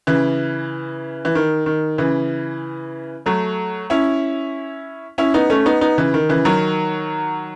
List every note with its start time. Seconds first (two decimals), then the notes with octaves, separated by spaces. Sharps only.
0.07 C#3 E3
1.25 E3
1.35 D#3
1.66 D#3
1.98 C#3 E3
3.26 F#3 A3
3.90 C#4 E4
5.18 C#4 E4
5.34 B3 D#4
5.50 A3 C#4
5.66 B3 D#4
5.81 B3 D#4
5.98 C#3 E3
6.14 D#3
6.29 C#3 E3
6.45 D#3 F#3